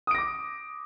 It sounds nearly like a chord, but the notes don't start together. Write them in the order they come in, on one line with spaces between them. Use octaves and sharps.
D#6 D7 A#6 D6